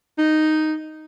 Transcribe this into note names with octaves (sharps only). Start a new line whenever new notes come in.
D#4